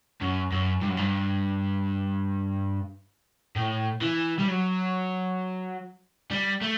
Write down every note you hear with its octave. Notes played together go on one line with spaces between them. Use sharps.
F#2
F#2
G2
F#2
G2
A2
E3
G3
F#3
G3
A3